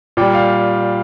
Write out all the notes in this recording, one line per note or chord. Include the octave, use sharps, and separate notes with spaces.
A#2 G3 G5
F5